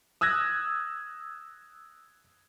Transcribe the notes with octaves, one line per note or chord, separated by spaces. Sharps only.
D#6 E6 F#6 G#6 A#6